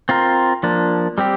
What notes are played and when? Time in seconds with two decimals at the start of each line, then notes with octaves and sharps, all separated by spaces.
0.09 C4 F4 A#4
0.63 F3 A#3 D4
1.18 G3 C4 G4